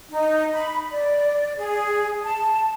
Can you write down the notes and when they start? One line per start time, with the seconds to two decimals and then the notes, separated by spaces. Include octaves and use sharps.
0.10 D#4
0.53 B5
0.92 D5
1.57 G#4
2.22 A5